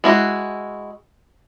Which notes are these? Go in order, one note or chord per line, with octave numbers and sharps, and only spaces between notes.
G#3 E4 F#4